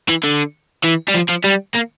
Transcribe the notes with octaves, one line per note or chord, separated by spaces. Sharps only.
E3
D3
E3
G3
F3
F3
G3
A#3